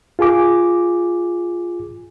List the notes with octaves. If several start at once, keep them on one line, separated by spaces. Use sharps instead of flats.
F4 G#4 G#5 D6